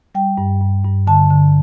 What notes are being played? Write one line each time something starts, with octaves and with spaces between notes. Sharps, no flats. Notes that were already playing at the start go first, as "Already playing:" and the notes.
G3 G5
G2
G2
G2
D3 A5
D3